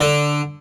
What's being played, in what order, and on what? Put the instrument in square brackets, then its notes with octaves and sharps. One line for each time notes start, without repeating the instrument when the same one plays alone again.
[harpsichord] D3